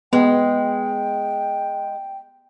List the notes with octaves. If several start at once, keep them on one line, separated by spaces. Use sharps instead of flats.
G#3 B3 G5